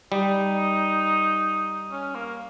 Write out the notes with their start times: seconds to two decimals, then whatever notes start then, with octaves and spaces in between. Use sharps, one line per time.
0.12 G3 D#4
1.92 C#4
2.15 A#3